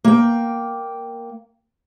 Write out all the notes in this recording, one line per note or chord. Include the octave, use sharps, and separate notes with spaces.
A#3 G5